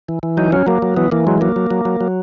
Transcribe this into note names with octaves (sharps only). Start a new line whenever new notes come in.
E3
E3
F#3 D#4
F#3 C#4
F#3 A#3
F#3
E3 B3
E3 A#3
F#3 G#3
F#3 A#3
F#3
F#3
F#3
F#3